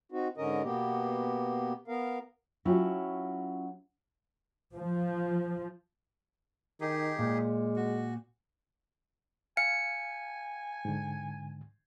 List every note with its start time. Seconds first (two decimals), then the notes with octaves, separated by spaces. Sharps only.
0.12 C4 D#4 F#4
0.38 G#2 D3 C#4 A#4 D#5
0.64 B2 A#3 B3 G4
1.88 B3 A#4 F5
2.65 F#3 C#4 E4 F4 G4
4.74 F3
6.81 D#3 D#4 G4 G#4
7.18 A#2 G#3
7.76 F#4
9.57 F5 G#5 C#7
10.85 G#2 D3